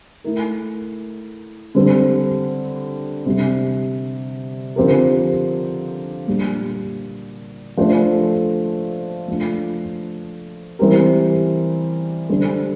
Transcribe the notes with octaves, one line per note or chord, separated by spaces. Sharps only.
A3 E4 A#4
D3 G3 C4
C3 G3 D4
D3 F3 C4 G4 A#4
A#2 G3 D4 G4
F3 A3 D4 A4 C5
F3 A3 D4 F4
E3 G3 C4 G4 A#4
D3 G3 D4 A4 C5